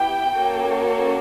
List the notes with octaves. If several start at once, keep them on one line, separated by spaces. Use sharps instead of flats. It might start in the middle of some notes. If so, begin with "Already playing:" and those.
Already playing: B3 E4 G4 G5
A#3 C#4 F#4 A4